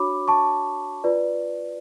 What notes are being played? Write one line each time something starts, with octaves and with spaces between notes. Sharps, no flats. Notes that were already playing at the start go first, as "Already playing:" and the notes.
Already playing: D4 F#4 C#5 B5 D6
A5 C#6
F4 B4 D5